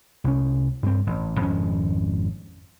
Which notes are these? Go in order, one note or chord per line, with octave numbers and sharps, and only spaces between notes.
C2 C#4
G2 C4
A1
G#1 F2 C#4